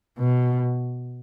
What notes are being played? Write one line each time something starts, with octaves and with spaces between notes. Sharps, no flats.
B2